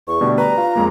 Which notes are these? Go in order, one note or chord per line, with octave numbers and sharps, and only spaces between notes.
E2 C#6
B2 D3 G3 A3
B4 A#5
F4
F2 G#3 A#3